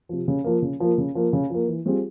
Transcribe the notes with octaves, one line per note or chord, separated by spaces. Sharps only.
C3 F3
C#3
F3 A#3
C#3
F3 A#3
C#3
F3 A#3
C#3
F3 A#3
E3
G3 C4 F4 G#4